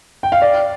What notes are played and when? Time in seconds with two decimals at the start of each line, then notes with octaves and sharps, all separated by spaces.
0.23 G5
0.32 F5
0.41 D5